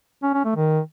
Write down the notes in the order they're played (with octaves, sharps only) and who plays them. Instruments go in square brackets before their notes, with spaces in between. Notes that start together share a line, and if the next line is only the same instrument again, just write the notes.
[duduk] C#4
C#4
A3
D#3